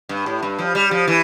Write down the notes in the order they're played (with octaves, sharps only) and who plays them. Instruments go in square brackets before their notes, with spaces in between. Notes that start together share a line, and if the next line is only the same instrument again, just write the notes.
[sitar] G2
A2
G2
F3
G3
F3
E3